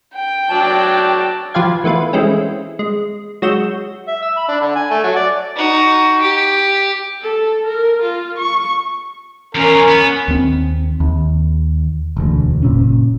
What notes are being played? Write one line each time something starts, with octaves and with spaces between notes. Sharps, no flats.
G5
F#3 D5 A5
F3 F4 G4 B4 F5 G#6
E3 A3 B3 F4 B4
E3 G#3 A3 C4 C#4
G#3
F#3 G#3 F#4 E6 G6
E5
E6
B5
D4
D3
G#5
A3
F#3
D5
D#4 F#4
G4
A4
A#4
F4
C#6
E2 C#4 F4 A#4
B3
D#2 C4
D#2
E1 D2
F#1 A#2 C#4